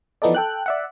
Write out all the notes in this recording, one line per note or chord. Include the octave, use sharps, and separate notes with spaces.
E3 F3 B3 D#4 A4 D5
A4 G5 F#6
D5 E5 F#5